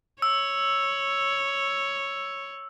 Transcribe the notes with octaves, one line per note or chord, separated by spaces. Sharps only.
C#5 E6